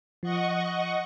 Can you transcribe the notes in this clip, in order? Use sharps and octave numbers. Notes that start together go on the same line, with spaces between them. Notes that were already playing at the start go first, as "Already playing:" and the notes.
F3 D#5 F#5 C#6